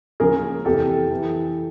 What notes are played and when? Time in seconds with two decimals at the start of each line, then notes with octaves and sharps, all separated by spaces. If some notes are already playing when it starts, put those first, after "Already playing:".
0.20 C#2 C#3 F3 A#3 C#4 G#4 A#4
0.65 F2 C3 E3 G4 A4
1.11 E3